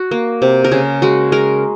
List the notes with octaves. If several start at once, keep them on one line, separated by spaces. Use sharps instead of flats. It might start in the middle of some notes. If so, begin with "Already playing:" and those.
Already playing: F#4
A#3
C3
A#4
C#3 G#4
G#3 F#4
G#3 A#4